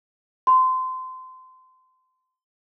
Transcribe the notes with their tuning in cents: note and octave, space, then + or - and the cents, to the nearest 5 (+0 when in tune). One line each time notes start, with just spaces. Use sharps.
C6 -25